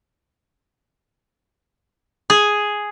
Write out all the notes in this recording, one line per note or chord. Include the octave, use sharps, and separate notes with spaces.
G#4